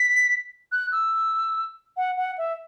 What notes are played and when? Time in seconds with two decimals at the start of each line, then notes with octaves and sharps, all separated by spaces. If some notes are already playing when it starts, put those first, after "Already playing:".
Already playing: B6
0.72 F#6
0.92 E6
1.97 F#5
2.17 F#5
2.38 E5